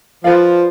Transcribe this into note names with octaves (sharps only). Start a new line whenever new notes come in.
F3 B4 D5 F5